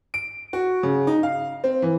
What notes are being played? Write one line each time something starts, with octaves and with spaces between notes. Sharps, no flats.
D7
F#4
C#3
D#4
F5
C4
E3